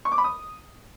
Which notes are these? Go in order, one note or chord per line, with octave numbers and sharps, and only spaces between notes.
C#6
D6
B5
D#6